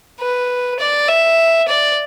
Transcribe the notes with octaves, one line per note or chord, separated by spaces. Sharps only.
B4
D5
E5
D5